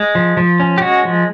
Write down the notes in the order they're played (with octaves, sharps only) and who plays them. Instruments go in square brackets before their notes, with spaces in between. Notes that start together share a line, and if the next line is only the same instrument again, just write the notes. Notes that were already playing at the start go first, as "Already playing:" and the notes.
Already playing: [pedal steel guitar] G#3
F3
F3
C#4
G4
G#3 F#4
F3